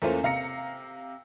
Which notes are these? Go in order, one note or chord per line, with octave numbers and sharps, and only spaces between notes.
E2 A3 A#3 C#4 F4 C5
C3 F5 A#5 A#6 C#7